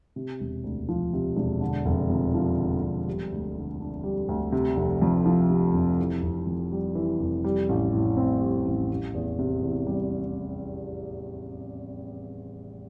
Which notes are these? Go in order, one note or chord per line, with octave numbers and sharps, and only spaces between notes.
C3
E1
D2
F3
C3
E1
D3
F1
F2
F3
D3
F1
G3
D2
D3
D4
G3
D2
C3
F1
F2
F3
C3
F1
E3
F1
F2
G3
E3
F1
G3
A1
A2
C4
G3
A1
G3
E2
C3
E2
G3